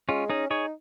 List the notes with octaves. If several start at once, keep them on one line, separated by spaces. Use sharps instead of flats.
G#3 C#4 F4
C#4 D#4 G#4
D#4 G#4 C#5